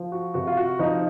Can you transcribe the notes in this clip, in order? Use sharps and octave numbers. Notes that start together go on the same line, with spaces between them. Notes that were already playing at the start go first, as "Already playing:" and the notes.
Already playing: F3
F#4
C3 F#4
F4
F#4
F3 D#4